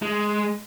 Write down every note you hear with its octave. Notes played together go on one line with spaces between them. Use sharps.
G#3